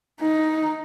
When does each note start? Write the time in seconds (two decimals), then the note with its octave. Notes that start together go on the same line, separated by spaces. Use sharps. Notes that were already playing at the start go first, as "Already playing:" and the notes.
0.21 D#4